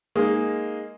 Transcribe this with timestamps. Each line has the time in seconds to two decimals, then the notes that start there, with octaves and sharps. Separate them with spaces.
0.15 G#3 A#3 D#4 G#4